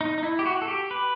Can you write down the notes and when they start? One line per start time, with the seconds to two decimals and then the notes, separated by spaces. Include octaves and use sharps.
0.01 D#4
0.18 D#4
0.23 E4
0.39 G4
0.46 F#4
0.62 A4
0.68 G4
0.91 B4